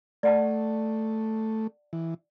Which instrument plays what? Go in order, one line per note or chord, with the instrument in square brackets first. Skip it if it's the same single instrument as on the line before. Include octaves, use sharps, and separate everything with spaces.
[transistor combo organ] A3 [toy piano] D5 F#5 A5
[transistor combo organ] E3